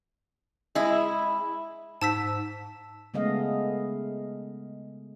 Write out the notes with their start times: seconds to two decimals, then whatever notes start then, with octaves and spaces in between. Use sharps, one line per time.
0.75 G#3 E4
2.02 G#2 A5 E6 B6
3.14 C#3 G#3 A3 B3 D#5 F5